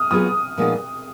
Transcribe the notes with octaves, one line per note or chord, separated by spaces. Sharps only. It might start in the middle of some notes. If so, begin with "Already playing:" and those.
Already playing: D#6 F6
F#3 B3 F4 G#4 B4 D#6
A#2 F3 G#3 B3 D#4